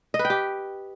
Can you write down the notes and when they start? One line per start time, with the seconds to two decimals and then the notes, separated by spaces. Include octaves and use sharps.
0.14 D#5
0.19 B4
0.25 G5
0.30 G4